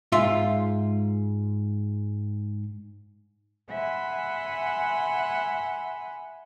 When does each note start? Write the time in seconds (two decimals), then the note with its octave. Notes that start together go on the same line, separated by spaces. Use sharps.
0.12 G#2 F4 E5 C6
3.70 E5 F#5 G#5 B5 C6